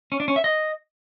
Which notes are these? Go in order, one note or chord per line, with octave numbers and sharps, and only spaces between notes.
C#4
D4
C#4
E5
D#5